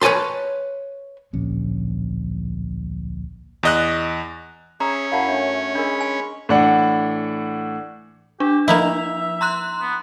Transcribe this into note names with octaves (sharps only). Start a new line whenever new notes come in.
B4 C#5 G#5 A5 C6
D1 A#1 C#4
E2 D#5 F#6
C#4 G#4 E5 A#5
F#2 E4 F5 F#5 A5 B5
A3 D4
G#3 D4 A#4 B5
G#5
A2 E3 D4 F#5
D4 G4
F3 A#3 D#4 E4 E5 F7
A#5 C6 F#6
B3